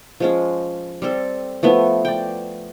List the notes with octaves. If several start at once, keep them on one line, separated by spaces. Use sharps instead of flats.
F3 G#3 C#4
G3 C4 A4
F3 A3 B3 E4
D5 G5